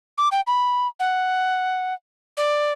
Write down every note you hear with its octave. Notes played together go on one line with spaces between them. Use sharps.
D6
G5
B5
F#5
D5